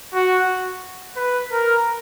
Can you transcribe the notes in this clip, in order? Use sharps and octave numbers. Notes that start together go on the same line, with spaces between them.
F#4
B4
A#4